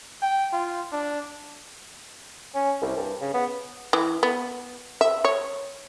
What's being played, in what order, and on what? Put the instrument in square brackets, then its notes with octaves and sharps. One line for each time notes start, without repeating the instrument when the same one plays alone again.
[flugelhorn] G5
F4
D4
[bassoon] C#4
C2
G2
C#3
B3
[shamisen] E3
B3
E5
C#5